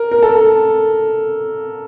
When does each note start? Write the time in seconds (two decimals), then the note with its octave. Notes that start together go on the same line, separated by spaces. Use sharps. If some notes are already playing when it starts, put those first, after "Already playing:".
Already playing: A#4
0.11 A#4
0.23 A4